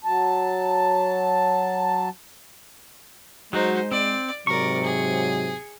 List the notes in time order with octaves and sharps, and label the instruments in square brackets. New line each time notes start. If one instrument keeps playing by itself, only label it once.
[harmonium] F#3 A5
[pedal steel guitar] F#3 F#4 [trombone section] G#3 [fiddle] D#4 C5
[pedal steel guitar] C4 [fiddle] D5
[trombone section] G#2 C3 F#3 [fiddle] A#4 D5 [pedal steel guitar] C#6
[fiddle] G#4